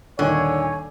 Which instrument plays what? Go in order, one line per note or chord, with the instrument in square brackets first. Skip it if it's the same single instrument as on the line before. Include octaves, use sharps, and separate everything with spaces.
[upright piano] D#1 D#3 [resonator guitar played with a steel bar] D3 [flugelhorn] C#5 [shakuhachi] G#5